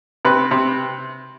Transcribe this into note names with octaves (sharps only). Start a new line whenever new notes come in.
C3 B4
C3